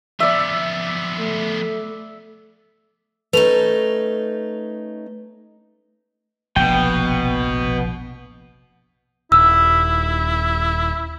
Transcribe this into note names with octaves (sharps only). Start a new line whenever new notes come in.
F3 B3 D5 E5
A3
A3 C#4 D#4 B4 F7
F1 A#1 B2 G5
D#1 E4 E6